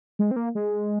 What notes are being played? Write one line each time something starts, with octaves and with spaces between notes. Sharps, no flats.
G#3
C4
A#3
G#3